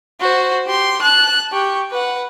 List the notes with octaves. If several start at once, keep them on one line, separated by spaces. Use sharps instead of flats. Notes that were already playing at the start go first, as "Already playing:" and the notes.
F#4 C5
G4 C6
A5 F#6
G4 C#6
B4 F#5